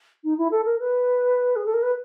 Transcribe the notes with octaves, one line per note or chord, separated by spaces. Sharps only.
D#4
E4
A4
A#4
B4
G#4
A4
A#4
B4